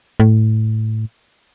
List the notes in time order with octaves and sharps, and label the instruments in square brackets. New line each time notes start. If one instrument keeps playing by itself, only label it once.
[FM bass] A2